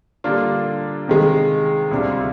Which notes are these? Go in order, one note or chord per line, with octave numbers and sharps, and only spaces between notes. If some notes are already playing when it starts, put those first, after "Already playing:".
D3 G3 A#3 D4 F4
C3 D#3 G#3
D2 C3 G3 D4 F4